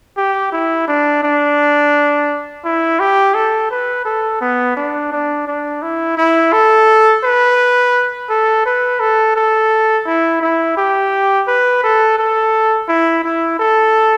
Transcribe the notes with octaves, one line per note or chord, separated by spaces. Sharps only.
G4
E4
D4
D4
E4
G4
A4
B4
A4
B3
D4
D4
D4
E4
E4
A4
B4
A4
B4
A4
A4
E4
E4
G4
B4
A4
A4
E4
E4
A4